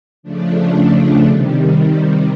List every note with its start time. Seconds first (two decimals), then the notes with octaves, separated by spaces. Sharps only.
0.23 C#3 F3 A3 D4
1.25 C3 D#3 G3